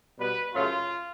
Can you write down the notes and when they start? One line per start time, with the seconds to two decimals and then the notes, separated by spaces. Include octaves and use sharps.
0.18 B2 G3 B3 B4
0.53 F#2 C#3 F#3 A3 F4